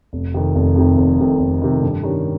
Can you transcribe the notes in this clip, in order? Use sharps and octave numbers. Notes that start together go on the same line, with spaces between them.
F1
F2 C3 D#3
F1
F2 C3 D#3
F1
F2 C3 D#3
F1
F2 C3 D#3
G2
D#3 G3 C#4 G4